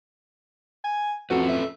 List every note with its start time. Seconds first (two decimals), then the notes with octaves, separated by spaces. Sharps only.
0.84 G#5
1.30 F2 C#4 F#4 A4 B4
1.49 E5